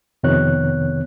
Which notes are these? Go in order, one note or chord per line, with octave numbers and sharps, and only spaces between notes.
F2 C3 D#3 B3 C#5 F#6